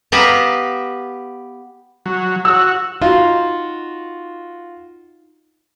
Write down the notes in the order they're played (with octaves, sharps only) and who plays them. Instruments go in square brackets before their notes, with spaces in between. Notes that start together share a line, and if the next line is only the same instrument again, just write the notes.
[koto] B3 G4 B4 E5 F5 A#5
[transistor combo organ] F#3
[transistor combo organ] F#4 [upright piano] E6
[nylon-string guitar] D#4 [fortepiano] F4 F#4